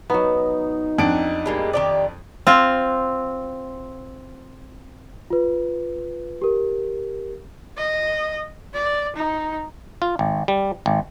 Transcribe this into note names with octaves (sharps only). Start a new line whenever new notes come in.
F#3 B3 D#4
F2 D4 F#5 D7
G3 G#3 A#3
D#3 G4 D5
C4 F4
F4 B4
G4 A#4
D#5
D5
D#4
F4
G#1
G3
G#1